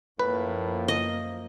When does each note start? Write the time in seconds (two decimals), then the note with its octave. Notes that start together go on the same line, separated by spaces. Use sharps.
0.19 F#2 A2 F3 A#3 B4
0.88 D#5